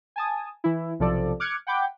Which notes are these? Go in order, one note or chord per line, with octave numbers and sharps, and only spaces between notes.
G#5 A5 D#6
E3 E4
B1 C3 F3 A4 D5
D6 F6 F#6 G#6 C#7
F#5 G5 B5 D6 G6